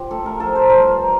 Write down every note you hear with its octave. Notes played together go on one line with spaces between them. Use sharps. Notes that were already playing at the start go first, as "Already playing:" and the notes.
Already playing: F3 F4 G4
A3 A4
A#4
F3 A4
C5
G2 A#4